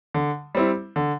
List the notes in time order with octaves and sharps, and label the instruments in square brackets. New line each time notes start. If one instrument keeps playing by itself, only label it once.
[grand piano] D3
G3 C4 E4
D3